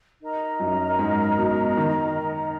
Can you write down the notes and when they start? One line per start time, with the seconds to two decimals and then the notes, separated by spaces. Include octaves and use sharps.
0.20 D#4 A#4 D#5 A#5
0.60 F#2
0.99 G#2
1.38 B2
1.77 D#3